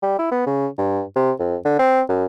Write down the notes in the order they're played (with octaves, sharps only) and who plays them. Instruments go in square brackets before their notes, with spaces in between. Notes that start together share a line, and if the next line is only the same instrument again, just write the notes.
[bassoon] G3
E4
B3
C#3
G2
C3
F2
D3
C4
F#2